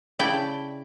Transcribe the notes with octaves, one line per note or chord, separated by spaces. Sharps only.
C#3 E4 D5 G5 A5